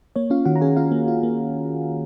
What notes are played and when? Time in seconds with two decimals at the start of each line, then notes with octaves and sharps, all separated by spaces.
0.16 A#3 C#5
0.30 C#4 F4 F5
0.45 D#3 F#4 F#5
0.56 A#5
0.61 C#4 G#4 G#5
0.76 C#4 F4 F5
0.92 A#3
1.08 F4
1.23 A#3